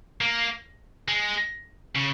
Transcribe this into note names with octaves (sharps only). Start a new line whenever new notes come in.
A#3
G#3
C#3